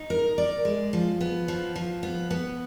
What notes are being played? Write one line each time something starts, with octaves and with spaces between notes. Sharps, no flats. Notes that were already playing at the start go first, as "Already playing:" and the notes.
Already playing: D#4
A#4
D5
G#3
F3
B3
F3
F3
B3
B3